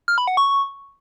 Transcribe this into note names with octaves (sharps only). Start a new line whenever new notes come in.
F6
B5
F#5
C#6